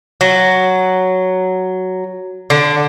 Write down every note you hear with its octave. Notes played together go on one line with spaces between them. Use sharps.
F#3
D3